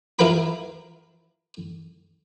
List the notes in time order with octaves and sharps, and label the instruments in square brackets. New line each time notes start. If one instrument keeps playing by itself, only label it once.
[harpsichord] E4 F4 A#4 B4 G5 B5